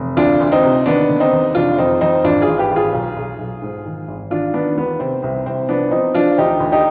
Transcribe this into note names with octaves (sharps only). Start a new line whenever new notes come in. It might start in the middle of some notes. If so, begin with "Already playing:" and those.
Already playing: F1
D2 D4 F4
D2
C4 D#4
C3
D#2 B3 D4
D3
C4 D#4
D#2
F1 D4 F4
F2 C4 D#4
F2 C4 D#4
G#1 D4 F4
F4 G#4
G#1
G4 B4
G#1
F4 G#4
B1
B1
B1
G#2
D#3
G#1
D#3 D4 F4
D#3 B3 D4
D#2 B3
C3 C4
C2 C4
C2 C4
F3 B3 D4
F3 C4 D#4
F3 D4 F4
D2 D#4 G4
D2
D#4 G4